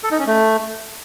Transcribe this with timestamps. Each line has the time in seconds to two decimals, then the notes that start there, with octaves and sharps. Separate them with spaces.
0.03 A4
0.11 D#4
0.19 C#4
0.27 A3